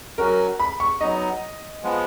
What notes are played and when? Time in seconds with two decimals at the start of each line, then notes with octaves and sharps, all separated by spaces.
0.18 F#3 C#4 F#4 A#4
0.60 B5
0.80 C#6
1.00 F#3 B3 D#4 D#5
1.83 F3 G#3 B3